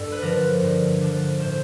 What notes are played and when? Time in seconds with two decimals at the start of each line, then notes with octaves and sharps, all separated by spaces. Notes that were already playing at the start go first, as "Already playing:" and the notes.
Already playing: G2 A4
0.12 B4
0.22 D3 F3 A#4
0.62 G2
1.01 D3 F3
1.40 A2 C5